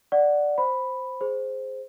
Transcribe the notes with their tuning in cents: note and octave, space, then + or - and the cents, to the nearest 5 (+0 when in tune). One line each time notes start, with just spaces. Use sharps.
D5 +0 F#5 +0
C5 +0 B5 +0
G#4 +5 C5 +0